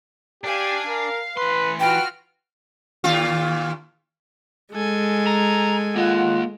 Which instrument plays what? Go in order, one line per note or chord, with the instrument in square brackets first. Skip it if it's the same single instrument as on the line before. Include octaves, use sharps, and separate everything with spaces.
[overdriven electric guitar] D4 [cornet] G4 [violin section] F5 G#5
[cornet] A#4 [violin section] F5
[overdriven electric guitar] E3 C6 [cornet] B4
[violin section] F4 F#4 F6 [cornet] B4 [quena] G5
[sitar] D#2 A#2 F4
[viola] G#3 [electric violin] A4 G#5
[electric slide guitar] A#5
[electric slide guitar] A#3 D#5 [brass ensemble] F4 F#5